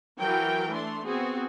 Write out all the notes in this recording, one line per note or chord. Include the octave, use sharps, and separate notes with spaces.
E3 F#3 A#4 G5
A3 D4 C6
B3 C4 F#4 G#4